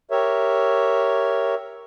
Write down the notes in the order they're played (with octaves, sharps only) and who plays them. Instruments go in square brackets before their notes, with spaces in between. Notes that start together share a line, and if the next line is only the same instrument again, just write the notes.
[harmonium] G4 A#4 C#5 E5